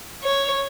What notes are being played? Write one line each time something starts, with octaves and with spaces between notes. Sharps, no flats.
C#5